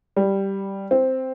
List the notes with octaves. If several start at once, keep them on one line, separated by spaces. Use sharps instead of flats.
G3
C4